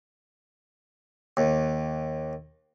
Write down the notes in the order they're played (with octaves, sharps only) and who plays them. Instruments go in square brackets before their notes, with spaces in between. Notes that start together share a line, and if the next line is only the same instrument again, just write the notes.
[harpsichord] D#2